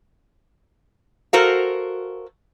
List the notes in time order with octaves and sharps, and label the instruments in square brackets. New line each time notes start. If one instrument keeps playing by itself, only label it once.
[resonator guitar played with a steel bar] F#4 A4 A#4 C5 F5